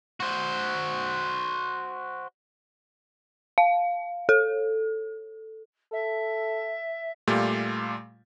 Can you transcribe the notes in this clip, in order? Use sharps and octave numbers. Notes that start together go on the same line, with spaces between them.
F#4 C5
F5
A4
A4 E5
A#2 G3 A3 F4 G4